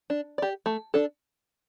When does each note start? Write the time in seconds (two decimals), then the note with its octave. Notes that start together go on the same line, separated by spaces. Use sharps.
0.10 D4
0.38 G4 D5
0.66 A3
0.94 D4 A4